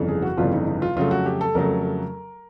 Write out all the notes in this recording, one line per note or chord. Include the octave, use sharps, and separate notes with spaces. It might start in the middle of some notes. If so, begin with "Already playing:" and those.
Already playing: G1 F2 C#3 E3 G3
G#4
F#4
G1 F2 C#3 E3 G3 F4
D#4
D#4
F4
F2 C#3 F#3 A3 F4
F#4
G4
A4
F2 C#3 F#3 A3 A#4